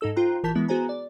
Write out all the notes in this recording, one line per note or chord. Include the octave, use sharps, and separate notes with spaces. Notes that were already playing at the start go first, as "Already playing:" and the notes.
G#2 D#4 A4 E6
F4 C5 G5 A#5 C6 F#6
A1 E3 A#4 A5 G6 B6
E3 G#3 B3 E4
B3 F#4 G#4 C5 G#5 A#5
D5